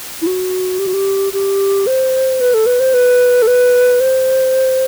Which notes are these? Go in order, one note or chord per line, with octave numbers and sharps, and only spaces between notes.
E4
F#4
G4
F#4
G4
G4
C5
B4
A4
B4
C5
B4
A4
B4
C5